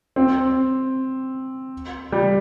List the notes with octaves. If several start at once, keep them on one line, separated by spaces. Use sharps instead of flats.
C4
G3